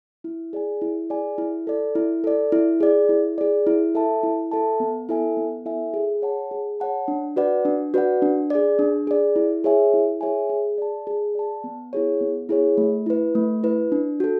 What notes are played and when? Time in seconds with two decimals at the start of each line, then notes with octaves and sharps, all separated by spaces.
0.24 E4
0.53 G#4 D5 G#5
0.82 E4
1.10 G#4 D5 G#5
1.38 E4
1.67 A4 D5
1.95 E4
2.24 A4 D5
2.52 E4
2.80 G#4 D5
3.09 E4
3.38 G#4 D5
3.67 E4
3.95 A4 E5 A5
4.23 E4
4.52 A4 E5 A5
4.80 B3
5.09 E4 A4 E5 G#5
5.37 B3
5.66 E4 A4 E5 G#5
5.94 G#4
6.22 C#5 F#5 A5
6.51 G#4
6.80 C#5 F#5 A5
7.08 D4
7.36 F#4 B4 D5 F#5
7.65 D4
7.94 F#4 B4 D5 F#5
8.22 D4
8.50 G#4 D5
8.79 D4
9.07 G#4 D5
9.36 E4
9.64 G#4 C#5 E5 G#5
9.93 E4
10.21 G#4 C#5 E5 G#5
10.50 G#4
10.78 D5 A5
11.07 G#4
11.35 D5 A5
11.64 B3
11.93 E4 G#4 C#5
12.21 B3
12.49 E4 G#4 C#5
12.77 A3
13.06 E4 B4
13.35 A3
13.63 E4 B4
13.92 D4
14.20 F#4 A4